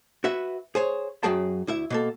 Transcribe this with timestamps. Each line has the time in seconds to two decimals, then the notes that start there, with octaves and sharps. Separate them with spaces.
0.24 F#4 B4 E5
0.75 G#4 C5 C#5
1.23 F#2 F#3 F#4 G#4 G5 A5
1.67 D2 E4 E5
1.90 B2 A#3 A4